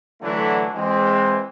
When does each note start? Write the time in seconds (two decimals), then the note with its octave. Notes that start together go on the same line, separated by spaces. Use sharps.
0.21 D3 E3 F#3 A3 D4 E4
0.74 E3 G#3 C4